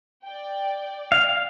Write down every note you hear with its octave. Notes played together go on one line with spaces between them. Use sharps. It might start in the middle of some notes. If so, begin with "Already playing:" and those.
D5 G5
F5